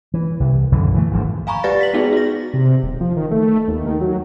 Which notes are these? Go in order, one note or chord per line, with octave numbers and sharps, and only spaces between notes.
E3
C2
B1 F#2 D3 E3
E3 F3 A3
G#1 D2 E3 F3
F5 G#5 A#5 B5 C#6
G3 G4 B4 D5 A6 A#6
B6 F#7
G#3 B3 D#4 F#4 G#4
F#4 A#6
C3
D#1
F3
D#3
A3
D#2
D#3
F#3